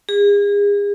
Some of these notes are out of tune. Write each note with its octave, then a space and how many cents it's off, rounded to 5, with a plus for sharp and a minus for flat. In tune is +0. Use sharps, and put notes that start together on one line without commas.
G#4 -35